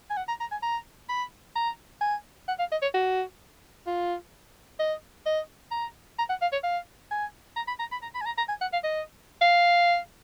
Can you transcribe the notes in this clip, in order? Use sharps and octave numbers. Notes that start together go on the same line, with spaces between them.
G#5
F#5
A#5
A#5
G#5
A#5
B5
A#5
G#5
F#5
F5
D#5
C#5
F#4
F4
D#5
D#5
A#5
A#5
F#5
F5
C#5
F5
G#5
A#5
B5
A#5
B5
A#5
B5
G#5
A#5
A#5
G#5
F#5
F5
D#5
F5